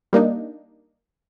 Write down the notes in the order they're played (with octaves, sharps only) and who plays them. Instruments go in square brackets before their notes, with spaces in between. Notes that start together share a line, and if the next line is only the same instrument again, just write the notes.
[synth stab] G3 A#3 D4 D#4